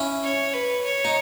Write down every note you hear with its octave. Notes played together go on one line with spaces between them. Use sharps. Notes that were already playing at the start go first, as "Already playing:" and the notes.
Already playing: C#4 E4
C#5
B4
C#5
D#4